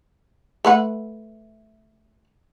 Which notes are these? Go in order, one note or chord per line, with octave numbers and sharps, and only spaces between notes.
A3 B4 F#5